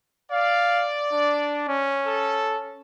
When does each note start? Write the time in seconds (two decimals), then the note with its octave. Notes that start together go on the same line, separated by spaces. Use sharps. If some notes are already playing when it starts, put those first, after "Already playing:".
0.32 D5 F5
1.12 D4
1.68 C#4
2.06 A4